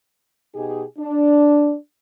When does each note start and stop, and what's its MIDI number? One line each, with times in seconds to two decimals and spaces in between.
0.55 0.83 47
0.55 0.83 63
0.55 0.83 67
0.55 0.83 68
0.99 1.74 62